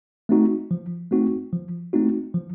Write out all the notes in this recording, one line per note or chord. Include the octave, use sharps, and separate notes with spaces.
A3 C4 D#4 F#4
F3
A3 C4 D#4 F#4
F3
A3 C4 D#4 F#4
F3